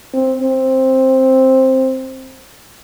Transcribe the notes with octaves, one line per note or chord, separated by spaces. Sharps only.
C4
C4